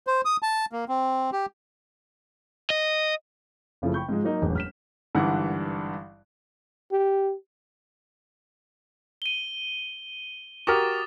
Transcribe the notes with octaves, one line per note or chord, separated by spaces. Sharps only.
C5
D#6
A5
A#3
C4
G4
D#5
F#1 C#3 F3 A3 E4
G5 B5 C#6 G6
G#2 F3 G#3
F#3 A#3 D#4 A#4
E1 A1 F#2
F6 B6 E7
G#1 G2 D3 E3 F#5
G4
D#7 G7
F#4 G4 A#4 D6 D#6 A6